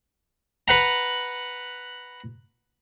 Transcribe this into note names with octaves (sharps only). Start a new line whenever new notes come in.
B4 F#5 A#5